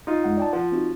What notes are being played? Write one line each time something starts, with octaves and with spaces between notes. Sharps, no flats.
D#4 F4
F2 G#3 F#5
D5 G5 A5
F3 F#5
C4 D#4 F#4